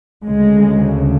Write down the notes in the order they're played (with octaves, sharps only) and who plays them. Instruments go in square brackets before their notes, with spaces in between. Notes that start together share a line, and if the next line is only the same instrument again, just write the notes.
[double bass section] D2 C#3 G#3